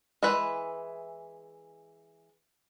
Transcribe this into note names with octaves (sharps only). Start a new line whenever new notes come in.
E3 G#3 E4 B4